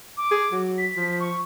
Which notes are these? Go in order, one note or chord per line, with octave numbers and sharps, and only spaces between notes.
D6
G#4
F#3
B6
F3
C#6